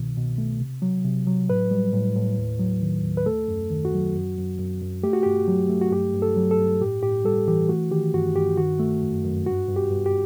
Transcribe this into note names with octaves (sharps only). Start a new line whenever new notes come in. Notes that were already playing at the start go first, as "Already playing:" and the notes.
Already playing: C2 B2 D#3
B2
A3
C3
F#3
C3
F#3
A2 B4
G3
A2
A2
D#2
F#3
D#3
D#2
B4
A3 A4
F#2
D#3
F#4
F#3
F#2
F#2
F#2
F#2
A3 G4
F#4
G2 G4
F#3
A3
F#4
G2 G4
G2
A4
F#3
A4
G2
A2 G4
A2 G4
G3 A4
E3 G4
A3 F#4
D#3 G4
G2 F#4
G2 G4
D#3 F#4
A3
F#2
F#2
G2 F#4
G2
G4
G2
G4